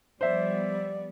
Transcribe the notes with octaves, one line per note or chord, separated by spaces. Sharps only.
F3 G3 B3 C5 D5 E5